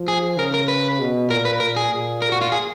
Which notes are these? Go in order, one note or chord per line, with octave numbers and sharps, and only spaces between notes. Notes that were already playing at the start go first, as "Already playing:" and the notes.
Already playing: F3
G#4
C#3 A#4
A#4
B4
B2
A#2 A#4
B4
A#2 A#4
G#4
A#2
A#4
F#4
F4
G#4